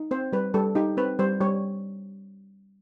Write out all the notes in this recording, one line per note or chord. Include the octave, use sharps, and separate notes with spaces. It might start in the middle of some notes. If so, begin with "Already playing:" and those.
Already playing: D#4
C4 C5
G3 B4
G3 A4
D#4 G4
C4 B4
G3 C5
G3 C#5